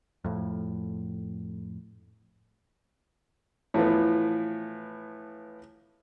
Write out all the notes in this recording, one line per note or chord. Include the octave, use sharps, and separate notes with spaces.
F2 A2
A2 E3 F3 B3